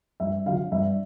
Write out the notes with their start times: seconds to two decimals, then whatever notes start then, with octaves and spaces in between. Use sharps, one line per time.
0.20 G2 E5
0.46 D3 F#3 F5
0.72 G2 E5